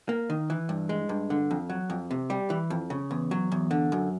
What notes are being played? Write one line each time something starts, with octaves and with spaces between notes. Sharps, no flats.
A#3
D#3
E3
G2
G#3
G2
D3
F2
F#3
F2
C3
G3
E3
F2
C#3
E2
F#3
E2
D3
F#2